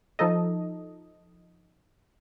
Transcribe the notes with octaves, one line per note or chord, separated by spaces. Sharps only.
F3 D#4 A4 D#5